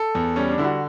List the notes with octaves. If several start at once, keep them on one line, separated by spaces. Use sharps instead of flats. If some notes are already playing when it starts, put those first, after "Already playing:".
Already playing: A4
E2
G3 C#4
D4
D3 E4
F#4